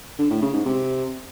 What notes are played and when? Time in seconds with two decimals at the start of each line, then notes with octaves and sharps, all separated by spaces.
0.18 D3
0.30 A2
0.42 C#3
0.54 G#2
0.65 C3